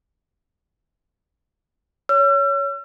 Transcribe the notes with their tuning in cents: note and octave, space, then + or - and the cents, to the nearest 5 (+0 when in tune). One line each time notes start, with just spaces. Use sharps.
C#5 +15 E6 +45